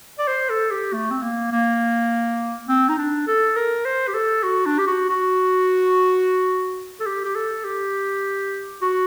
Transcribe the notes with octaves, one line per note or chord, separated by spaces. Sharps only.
D5
C5
A4
G4
A3
C4
A#3
A#3
C4
D#4
D4
A4
A#4
C5
G4
A4
F#4
D4
G4
F#4
F#4
A4
G4
G4
A4
G4
F#4